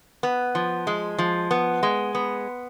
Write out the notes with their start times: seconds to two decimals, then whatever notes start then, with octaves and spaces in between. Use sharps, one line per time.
0.23 B3
0.55 F3
0.87 G#3
1.18 F3
1.51 B3
1.83 G#3
2.15 B3